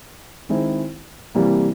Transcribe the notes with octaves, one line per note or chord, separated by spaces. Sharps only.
D#3 G#3 C4 E4
C3 E3 G3 A#3